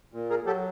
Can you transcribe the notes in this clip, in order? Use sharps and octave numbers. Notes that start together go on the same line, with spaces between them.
A#2
G#4 A#4
F#3 G4 A4